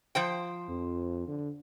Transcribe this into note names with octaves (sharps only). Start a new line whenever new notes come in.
F3 C5 G5
F2
D3